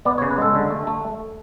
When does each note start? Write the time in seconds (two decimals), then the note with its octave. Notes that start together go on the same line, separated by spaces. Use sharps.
0.05 B3 D5
0.18 C#5
0.22 C#3
0.31 B4
0.38 G#3 A4
0.55 D3
0.70 A3
0.87 A3